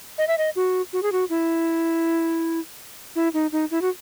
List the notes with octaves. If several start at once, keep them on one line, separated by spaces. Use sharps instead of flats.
D#5
E5
D#5
F#4
F#4
G#4
F#4
E4
E4
D#4
D#4
E4
F#4